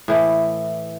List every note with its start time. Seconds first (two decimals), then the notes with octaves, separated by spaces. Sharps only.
0.08 A2 E3 A3